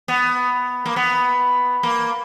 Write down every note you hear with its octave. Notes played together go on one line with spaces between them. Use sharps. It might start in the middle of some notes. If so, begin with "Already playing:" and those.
B3
A#3
B3
A#3